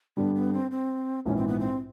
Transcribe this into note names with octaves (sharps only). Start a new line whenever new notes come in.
G2 D3 G3 B3
B3
C4
C4
A#1 G#2 E3 C#4
C4
B3
C4